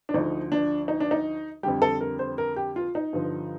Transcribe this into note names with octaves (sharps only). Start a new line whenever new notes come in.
D4
D2 D3 F3 D#4
D4
D#4
D4
D#4
F2 D3 G3 G4
A4
A#4
C5
A#4
G4
F4
D#4
G2 D3 F3